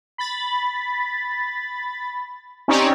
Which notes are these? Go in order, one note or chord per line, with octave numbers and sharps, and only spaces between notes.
B5 A6
C4 C#4 D#4 G4 C#5 D5